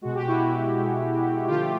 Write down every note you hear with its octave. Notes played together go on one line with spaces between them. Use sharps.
B2 G#3 F#4
G4
E4 F#4
B2 G#3
D3 F3 A3 F4 G4